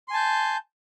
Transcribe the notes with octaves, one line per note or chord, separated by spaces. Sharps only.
G#5 A5 C6 G6